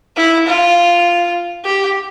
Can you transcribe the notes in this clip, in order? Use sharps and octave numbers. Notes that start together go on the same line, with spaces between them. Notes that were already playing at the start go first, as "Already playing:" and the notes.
E4
F4
G4